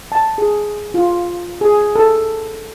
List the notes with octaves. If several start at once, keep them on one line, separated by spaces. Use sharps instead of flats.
A5
G#4
F4
G#4
A4